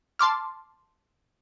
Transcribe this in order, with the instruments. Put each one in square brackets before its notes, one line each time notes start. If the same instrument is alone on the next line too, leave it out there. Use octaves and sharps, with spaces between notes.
[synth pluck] A5 C6 D6 F6